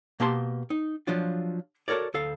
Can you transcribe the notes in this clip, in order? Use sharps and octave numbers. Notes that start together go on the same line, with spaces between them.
B2 A#3 G4 A5 C6
D#4
F3 F#3 D4 F4
F#4 A4 A#4 C#5 D5
D2 A4 F5